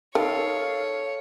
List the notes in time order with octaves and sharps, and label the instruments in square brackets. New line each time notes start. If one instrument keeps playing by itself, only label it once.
[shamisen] D#3 [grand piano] A4 [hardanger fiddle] C#5 [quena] F5